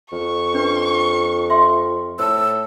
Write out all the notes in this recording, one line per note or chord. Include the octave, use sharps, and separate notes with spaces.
F2 C#6
C#4 D4 B4
E5 C6 E6
A2 C5 A5 E6